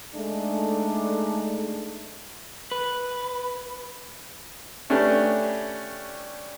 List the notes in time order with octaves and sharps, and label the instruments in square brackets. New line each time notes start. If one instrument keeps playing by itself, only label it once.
[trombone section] G#3 A3 D4 D#4 A4
[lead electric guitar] B4
[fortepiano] A3 C#4 D4 G4 B4